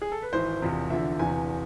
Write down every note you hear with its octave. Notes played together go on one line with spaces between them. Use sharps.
G#4
A4
B4
G#1 G#2 E3 C5
E1 E2 C3 F3
E2 D3 F3 E5
E1 E2 C3 E3 G#5